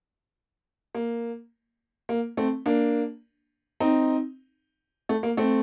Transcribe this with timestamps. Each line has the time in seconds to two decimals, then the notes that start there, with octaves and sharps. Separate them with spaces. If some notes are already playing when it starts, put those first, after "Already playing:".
0.95 A#3
2.09 A#3
2.37 A3 C4
2.66 A#3 D4
3.80 C4 D#4
5.09 A3
5.23 A#3
5.37 A3 C4